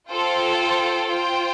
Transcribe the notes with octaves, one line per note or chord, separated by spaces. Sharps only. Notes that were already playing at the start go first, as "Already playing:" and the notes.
F4 A4 C5 G5
F4 C5 G5